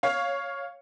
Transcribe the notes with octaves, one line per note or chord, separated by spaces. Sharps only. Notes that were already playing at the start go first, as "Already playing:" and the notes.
C#5 F5